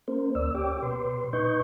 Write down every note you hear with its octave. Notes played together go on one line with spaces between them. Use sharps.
A#3 C#4 A#4 C5
D2 D5 E6
G4 C#5 G5 D6
B2 B4 C6
A#2 D#4 B4 D#5 C#6 G6